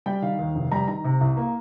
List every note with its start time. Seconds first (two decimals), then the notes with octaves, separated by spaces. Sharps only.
0.06 G3 G5
0.22 D#3 F5
0.39 D#2
0.55 F1
0.72 G3 A#5
0.88 D#3 A#5
1.04 C3
1.21 C2
1.37 A#3